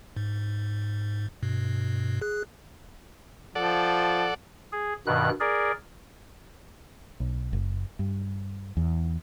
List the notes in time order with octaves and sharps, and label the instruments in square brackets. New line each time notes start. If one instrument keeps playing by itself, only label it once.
[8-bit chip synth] G#2
G2 B2
G#4 F#6
[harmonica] F3 [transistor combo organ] A4 D5 F#5
[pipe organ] G#4
G2 B2 D#3 F#6
G#4 A#4 D5
[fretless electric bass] B1
F#1
G2
E2